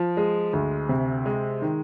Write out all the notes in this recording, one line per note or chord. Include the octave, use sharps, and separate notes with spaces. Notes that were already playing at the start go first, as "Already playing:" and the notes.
Already playing: F3
G#3
D2
C3
G#3
D#3